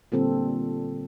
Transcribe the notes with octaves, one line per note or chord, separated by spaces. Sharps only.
A#2 D3 G3 C4 A4